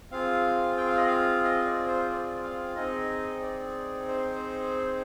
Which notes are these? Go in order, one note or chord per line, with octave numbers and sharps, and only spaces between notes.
C4 F4 G#4 F5
G5
F5
D#5
F5
D#5
D5
C5
D5
F5
C4 D#4 G#4 D#5
D5
C5